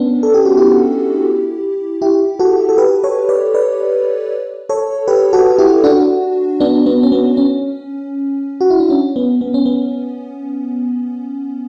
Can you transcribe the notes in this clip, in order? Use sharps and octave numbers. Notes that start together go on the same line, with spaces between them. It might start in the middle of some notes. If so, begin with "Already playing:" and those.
Already playing: B3 C#4 D4
A4
G4
F#4
E4 G4
E4 G4
F#4 A4
A4
G4 B4
A4 C#5
B4 D5
B4 D5
A4 C#5
G4 B4
F#4 A4
E4 G4
D4 F#4
B3 D4
B3 D4
C#4
B3
C#4
F#4
E4
D4
C#4
B3
B3
C#4
B3